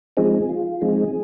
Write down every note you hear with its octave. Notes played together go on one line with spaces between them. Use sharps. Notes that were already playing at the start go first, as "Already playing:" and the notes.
F3 G#3 C4 D#4 G#4
F4
F3 G#3 C4 D#4 G#4